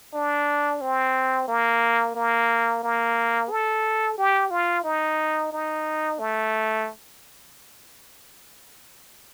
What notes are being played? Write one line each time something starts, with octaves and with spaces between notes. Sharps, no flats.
D4
C4
A#3
A#3
A#3
A4
G4
F4
D#4
D#4
A3